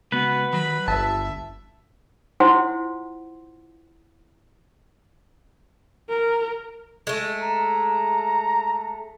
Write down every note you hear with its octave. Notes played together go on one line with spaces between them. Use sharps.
C#2 B3 F#4 B4
D#3 F#3 B5
G1 E5 A5
E4 F4 C5 F#5 C6
A#4
G#3 A3
A#5